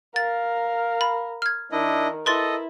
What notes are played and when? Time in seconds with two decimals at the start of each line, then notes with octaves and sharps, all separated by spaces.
0.16 A#4 F5 A6
1.01 B5
1.42 F6 G#6
1.72 D#3 D4 E4 A#4 D#5
2.26 E4 A4 B4 D#5 C6 A6